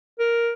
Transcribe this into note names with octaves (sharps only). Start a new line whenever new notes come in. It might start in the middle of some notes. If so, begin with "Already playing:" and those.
A#4